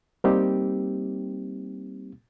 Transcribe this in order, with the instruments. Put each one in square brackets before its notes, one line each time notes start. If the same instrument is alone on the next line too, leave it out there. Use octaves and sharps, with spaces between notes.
[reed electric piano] G3 A#3 C4 D#4 G4